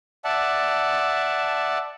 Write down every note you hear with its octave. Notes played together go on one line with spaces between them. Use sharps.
D5 E5 F#5 A5